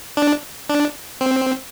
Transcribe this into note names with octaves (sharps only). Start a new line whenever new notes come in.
D4
D4
C4